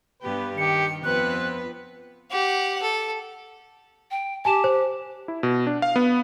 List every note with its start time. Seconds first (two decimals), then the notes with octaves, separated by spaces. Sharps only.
0.22 G2 B3 G4 B4
0.58 D#3 G4 C#7
1.04 F2 B3 C4 B4 F#6
2.31 G4 F#5
2.82 A4
4.11 G5
4.45 G4 G#5 A5 E7
4.64 C5
5.28 E4
5.43 B2
5.67 D4
5.82 F5
5.96 B3